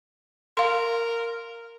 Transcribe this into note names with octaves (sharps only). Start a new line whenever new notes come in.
A#4 F5 C6